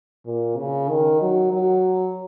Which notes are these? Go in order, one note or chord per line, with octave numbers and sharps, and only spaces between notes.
A#2
C#3
D#3
F#3
F#3